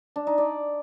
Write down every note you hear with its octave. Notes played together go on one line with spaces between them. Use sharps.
D4
D#4
D5